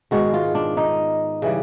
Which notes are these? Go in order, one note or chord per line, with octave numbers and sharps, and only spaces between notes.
G#2 D#3 G#3 B3 F#4
F4
D4
D#4
C#3 E3 G3